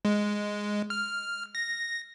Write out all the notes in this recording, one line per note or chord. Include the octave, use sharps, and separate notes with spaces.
G#3
F6
A#6